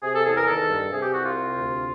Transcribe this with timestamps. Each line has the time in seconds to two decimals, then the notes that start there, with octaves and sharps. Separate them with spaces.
0.03 C3 G#4
0.15 A4
0.25 E2 G#4
0.37 A#4
0.48 D#3 A4
0.70 G2
0.92 C3 G#4
1.03 G4
1.14 C2 F#4
1.26 F4
1.36 C3
1.59 D2